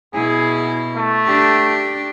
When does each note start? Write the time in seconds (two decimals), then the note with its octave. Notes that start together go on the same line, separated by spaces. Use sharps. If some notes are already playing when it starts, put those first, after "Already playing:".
0.14 B2 E4 G#4
0.96 A3
1.26 D4 G4